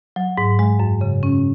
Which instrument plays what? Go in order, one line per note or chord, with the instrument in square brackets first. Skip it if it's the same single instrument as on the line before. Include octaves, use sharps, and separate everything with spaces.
[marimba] F#3
G#2
G#3
F#2
C#3
C#4